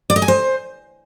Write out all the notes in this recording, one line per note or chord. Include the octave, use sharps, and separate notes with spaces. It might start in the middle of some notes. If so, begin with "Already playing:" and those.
D5
D#5
G#5
C5